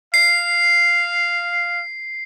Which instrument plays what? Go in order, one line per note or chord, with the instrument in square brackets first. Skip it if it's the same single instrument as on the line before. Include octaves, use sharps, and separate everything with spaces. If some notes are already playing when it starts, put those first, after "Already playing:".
[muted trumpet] F5 [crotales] C7